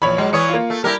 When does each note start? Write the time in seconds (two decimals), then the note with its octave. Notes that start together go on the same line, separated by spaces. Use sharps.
0.02 A#1 E2 C#5 B5
0.18 F#3 G#3
0.33 E2 E3 C#5 C#6 D#6 C#7
0.49 A#3 F4
0.70 A3
0.84 G3 E4 G4 A#4